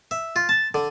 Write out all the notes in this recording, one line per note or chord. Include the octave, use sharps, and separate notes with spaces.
E5
F4
A5
D3